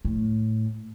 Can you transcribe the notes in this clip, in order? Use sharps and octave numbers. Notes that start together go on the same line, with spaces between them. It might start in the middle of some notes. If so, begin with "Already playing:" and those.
A2